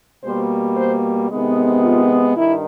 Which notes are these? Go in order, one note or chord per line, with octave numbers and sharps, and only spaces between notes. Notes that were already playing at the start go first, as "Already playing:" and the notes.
B2 G3 A#3 C5
C5
C3 D#3 G#3 B3
F4
G2 D#3 E4